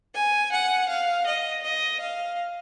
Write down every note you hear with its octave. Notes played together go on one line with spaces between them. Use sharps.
G#5
F#5
F5
D#5
D#5
F5